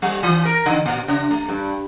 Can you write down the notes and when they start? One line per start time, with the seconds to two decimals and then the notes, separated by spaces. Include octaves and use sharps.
0.02 G3
0.23 E3
0.45 A#4
0.66 D3
0.86 A#2
1.08 C#3
1.31 A3
1.49 G2